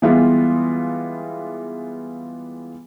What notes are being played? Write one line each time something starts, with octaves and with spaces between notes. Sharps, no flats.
E3 G3 G#3 B3 F4